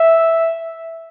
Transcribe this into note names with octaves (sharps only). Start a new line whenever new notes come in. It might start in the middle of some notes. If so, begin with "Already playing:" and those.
Already playing: E5